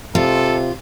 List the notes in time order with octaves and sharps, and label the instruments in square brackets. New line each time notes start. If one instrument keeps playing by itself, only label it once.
[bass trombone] C3 [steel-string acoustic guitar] F4 [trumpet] A4